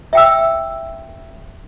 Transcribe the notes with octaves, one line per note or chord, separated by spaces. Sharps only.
E5 G5 E6